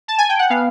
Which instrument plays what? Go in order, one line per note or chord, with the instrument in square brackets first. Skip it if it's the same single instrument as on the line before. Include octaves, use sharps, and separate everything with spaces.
[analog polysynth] A5
G#5
G5
F#5
B3 F5